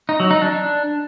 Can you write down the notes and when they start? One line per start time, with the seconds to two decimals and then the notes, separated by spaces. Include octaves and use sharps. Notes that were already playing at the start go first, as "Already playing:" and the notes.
0.09 D#4
0.20 F#3
0.31 D#4
0.42 D4
0.52 D4